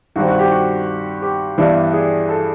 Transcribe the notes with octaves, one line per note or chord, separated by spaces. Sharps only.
G2 D#3 G3 C4 F#4
F#4
G4
F#4
G4
G2 E3 G3 B3 D4
G#4
A4